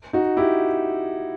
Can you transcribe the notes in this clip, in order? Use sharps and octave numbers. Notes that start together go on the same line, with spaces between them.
D#4 F#4
E4 G4